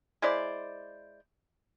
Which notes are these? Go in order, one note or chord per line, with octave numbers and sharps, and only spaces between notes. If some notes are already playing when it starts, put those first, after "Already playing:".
G#3 E4 C5 D5